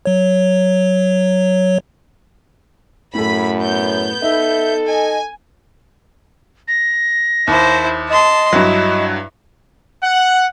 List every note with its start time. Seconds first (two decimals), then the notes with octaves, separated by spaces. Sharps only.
0.05 F#3 C#5
3.15 F#2 A2 G#4 A4 B5 B6
3.61 B3 C#5 G6
4.22 D#4 A4 E5
4.87 D#5 G#5
6.67 A#6
7.47 D#2 E4 C5
8.09 D#5 A5 C6
8.53 G2 F#3 E4
10.03 F#5